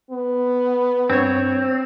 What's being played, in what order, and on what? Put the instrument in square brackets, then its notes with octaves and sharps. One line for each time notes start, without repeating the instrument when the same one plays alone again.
[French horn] B3
[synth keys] G2 C#5 [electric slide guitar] C4